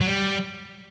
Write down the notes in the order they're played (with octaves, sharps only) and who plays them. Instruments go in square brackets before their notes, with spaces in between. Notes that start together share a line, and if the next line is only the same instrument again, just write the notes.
[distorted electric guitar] F#3
G3